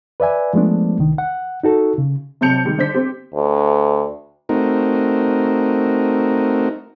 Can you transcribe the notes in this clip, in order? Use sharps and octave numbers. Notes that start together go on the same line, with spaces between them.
B4 D5 E5 G#5
F3 G#3 A3 B3 D4
C2 D#3
F#5
D#4 F#4 A4
C#3
C3 F#3 A5 G6 C#7 F7
D#3 G3 G#3
D3 D4 C5 G6 B6
C4 G4
D2
A3 C4 D#4 F#4 A#4